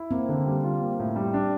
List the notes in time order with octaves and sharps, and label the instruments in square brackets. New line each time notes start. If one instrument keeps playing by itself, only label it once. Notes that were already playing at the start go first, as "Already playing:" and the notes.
Already playing: [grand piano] E4
[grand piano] A#3 [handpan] C4
[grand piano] D3
G3
F4
A#3
A2
G3
D4